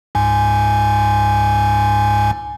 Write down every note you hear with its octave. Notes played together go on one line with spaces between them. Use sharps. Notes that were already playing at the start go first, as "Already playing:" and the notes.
C#2 G#2 G#5